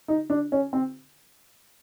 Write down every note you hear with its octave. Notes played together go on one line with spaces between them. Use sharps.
D#4
D4
C#4
C4